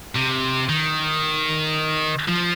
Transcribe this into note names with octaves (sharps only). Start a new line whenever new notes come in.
C3
D#3
F3